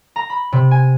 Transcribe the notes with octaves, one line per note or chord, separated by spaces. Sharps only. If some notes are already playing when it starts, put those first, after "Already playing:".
A#5
B5
C3
G#5